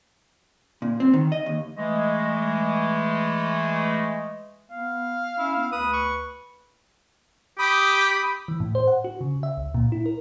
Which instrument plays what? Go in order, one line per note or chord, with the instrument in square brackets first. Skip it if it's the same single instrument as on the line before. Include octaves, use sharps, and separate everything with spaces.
[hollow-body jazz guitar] A#2
C4
D#3
D#5
D#2
[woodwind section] E3 G#3 A3 D#5
[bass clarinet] B3 [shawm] F5
[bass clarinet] C#4 [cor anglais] E4
[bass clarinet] B3
[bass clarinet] D2 [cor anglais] B4 [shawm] D#6
[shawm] C#6
[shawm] G4 [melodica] B5 D#6
[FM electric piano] E3
A2
C5
F#5
F#4
C#3
E5
C#2
A#2
E4
A#4